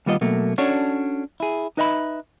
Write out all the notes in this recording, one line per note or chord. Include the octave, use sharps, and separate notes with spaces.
D#2 G3 B3 F4 D#5
B2 F#3 A3 A#3
C#4 D4 F#4 A4 C#5
E4 G#4
D#4 B4 D#5 E5 G5 B5